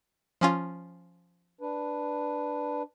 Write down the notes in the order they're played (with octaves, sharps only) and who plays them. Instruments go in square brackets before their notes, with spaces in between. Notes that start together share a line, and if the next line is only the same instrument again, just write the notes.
[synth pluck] F3 C#4 F4
[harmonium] D4 B4